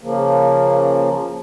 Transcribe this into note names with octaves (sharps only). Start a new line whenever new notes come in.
C#3 F3 A#3